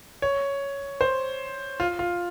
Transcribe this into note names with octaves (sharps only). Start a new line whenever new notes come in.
C#5
C5
F4
F4